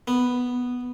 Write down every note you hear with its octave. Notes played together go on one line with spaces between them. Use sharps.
B3